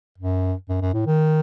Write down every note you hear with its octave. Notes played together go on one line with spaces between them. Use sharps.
F#2
F#2
F#2
A2
D#3